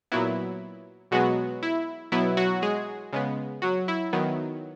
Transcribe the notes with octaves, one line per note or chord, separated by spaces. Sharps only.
A#2 F#3 B3 E4
B2 F#3 G#3 B3 F#4
E4
B2 F#3 B3 E4
F#3 F#4
G#3 G#4
C#3 G#3 B3
F#3 F#4
E4
D#3 F#3 B3